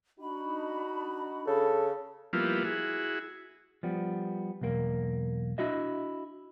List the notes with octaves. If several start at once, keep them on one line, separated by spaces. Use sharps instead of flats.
D4 D#4 F#4 B5
C#3 A4
F3 G3 A#3 B3 E4 F4
E4 F#4 G#4
F3 G3 B3
B1 E2 A#3 A#4
D4 E4 F#4 D#5 E5